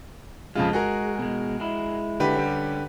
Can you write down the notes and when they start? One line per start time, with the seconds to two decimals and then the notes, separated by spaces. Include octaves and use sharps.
0.55 F2 C#3 G#3 F4
0.73 F#4 G#4 A#4
1.19 B2 G#3
1.60 G#3 E4
2.20 D3 G4 B4
2.36 G3 C#4